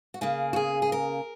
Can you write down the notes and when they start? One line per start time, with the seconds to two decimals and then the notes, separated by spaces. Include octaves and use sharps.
0.14 F#4
0.21 C#3 A#3 G#4
0.53 F#4
0.56 G#4
0.82 G#4
0.92 A#4